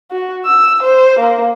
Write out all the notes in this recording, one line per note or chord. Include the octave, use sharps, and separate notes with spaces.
F#4
E6
C5
A#3